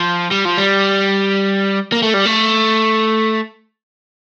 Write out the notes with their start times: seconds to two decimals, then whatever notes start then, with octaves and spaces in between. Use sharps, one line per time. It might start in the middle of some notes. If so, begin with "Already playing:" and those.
Already playing: F3
0.31 G3
0.45 F3
0.57 G3
1.92 A#3
2.02 A3
2.14 G3
2.26 A3